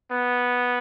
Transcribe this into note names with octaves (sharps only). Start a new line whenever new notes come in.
B3